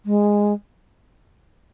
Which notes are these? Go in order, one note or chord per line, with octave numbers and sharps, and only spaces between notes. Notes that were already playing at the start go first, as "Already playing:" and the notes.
G#3